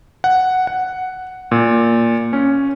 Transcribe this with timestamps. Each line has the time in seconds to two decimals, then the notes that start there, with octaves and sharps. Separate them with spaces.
0.24 F#5
0.67 F#5
1.51 A#2
2.33 C#4